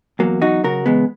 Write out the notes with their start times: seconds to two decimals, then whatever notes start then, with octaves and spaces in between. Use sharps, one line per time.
0.19 E2 F#3 A#3
0.42 F#3 D#4 F#4
0.64 C#3 F#4 A#4
0.86 E2 G#3 B3